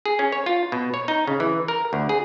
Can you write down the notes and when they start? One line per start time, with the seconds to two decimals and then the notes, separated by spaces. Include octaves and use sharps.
0.06 G#4
0.19 C#4
0.32 C#5
0.46 F4
0.72 B2
0.94 C#5
1.08 D#4
1.27 C#3
1.40 E3
1.68 A#4
1.93 D2
2.09 G#4